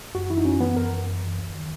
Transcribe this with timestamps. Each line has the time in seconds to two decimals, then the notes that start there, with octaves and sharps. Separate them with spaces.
0.15 F#2 F#4
0.30 E3 E4
0.37 D#4
0.45 F#2 C#4
0.60 E3 B3
0.77 F#2 A#4
0.92 E3
1.08 F#2
1.23 E3
1.38 D#2
1.55 D#3